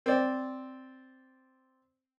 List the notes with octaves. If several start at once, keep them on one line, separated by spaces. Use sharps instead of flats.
C4 D5